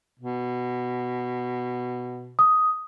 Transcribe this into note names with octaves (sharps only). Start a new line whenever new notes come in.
B2
D#6